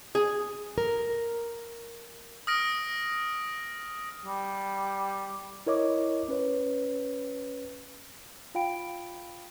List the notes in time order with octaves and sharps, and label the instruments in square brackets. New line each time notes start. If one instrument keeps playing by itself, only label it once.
[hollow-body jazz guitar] G#4
[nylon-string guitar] A#4
[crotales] D#6 F6 A#6 D7
[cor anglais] G3
[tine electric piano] E4 A#4 C#5 D#5 D6
C#4 B4 C#5
[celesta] F4 F5 G5 B5 D7